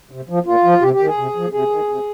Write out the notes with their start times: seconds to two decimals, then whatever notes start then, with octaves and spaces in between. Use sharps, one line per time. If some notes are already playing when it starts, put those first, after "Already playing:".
0.11 C3
0.29 F3
0.46 A#2 F4
0.64 F3
0.82 C3 G4
0.94 G4
1.00 D#3
1.06 G#4
1.18 C3
1.36 F3
1.52 C3 G#4
1.70 D#3
1.89 C3